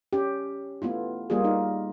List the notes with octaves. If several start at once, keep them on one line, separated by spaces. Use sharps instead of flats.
C#4 G4
A3 B3 E4 F4
G3 A#3 F4 G4 G#4
D#4